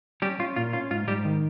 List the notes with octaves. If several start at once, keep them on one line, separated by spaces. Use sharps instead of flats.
G3 C#4 G4
C#4 F4
A#2 F4
C#4 F4
G#2 F4
G#2 G3 G4
D#3